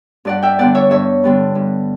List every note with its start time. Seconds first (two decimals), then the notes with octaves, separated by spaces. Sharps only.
0.25 G2 D5 F#5
0.42 E5 G5
0.59 D3 G3 B3 D5 F#5
0.75 C#5 E5
0.91 G2 C#5 E5
1.24 D3 G3 B3
1.55 G2